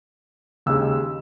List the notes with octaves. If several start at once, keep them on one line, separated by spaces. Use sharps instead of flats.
D#2 C#3 G#3 E6